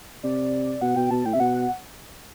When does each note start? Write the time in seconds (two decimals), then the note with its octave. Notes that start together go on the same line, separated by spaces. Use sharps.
0.23 C3 D5
0.81 B2 F#5
0.96 B2 G5
1.11 B2 A5
1.25 A2 G5
1.33 C3 E5
1.40 B2 F#5